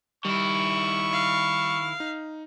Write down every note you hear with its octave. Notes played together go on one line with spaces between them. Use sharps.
D#3 G3 E4 C#6
F5
D#4